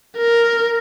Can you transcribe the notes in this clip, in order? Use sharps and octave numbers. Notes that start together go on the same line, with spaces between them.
A#4